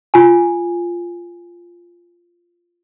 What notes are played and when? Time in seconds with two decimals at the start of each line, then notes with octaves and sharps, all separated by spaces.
0.14 F4 G#5